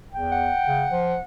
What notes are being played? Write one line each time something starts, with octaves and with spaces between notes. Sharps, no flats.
E2 G5
F#5
C#3
F3